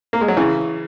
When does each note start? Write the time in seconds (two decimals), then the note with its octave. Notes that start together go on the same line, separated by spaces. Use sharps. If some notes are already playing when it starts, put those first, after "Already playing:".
0.13 A#3
0.21 G#3
0.28 F#3
0.37 C#3 E3